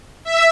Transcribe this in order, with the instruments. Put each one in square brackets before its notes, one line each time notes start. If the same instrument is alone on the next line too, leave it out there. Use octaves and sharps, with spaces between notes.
[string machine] E5